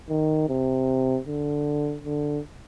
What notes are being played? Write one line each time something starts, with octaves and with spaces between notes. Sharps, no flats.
D#3
C3
D3
D3